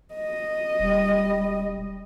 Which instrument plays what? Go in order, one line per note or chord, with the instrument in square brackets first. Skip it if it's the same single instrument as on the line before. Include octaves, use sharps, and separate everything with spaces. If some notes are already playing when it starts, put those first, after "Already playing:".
[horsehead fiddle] D#5
[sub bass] E1 [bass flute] G3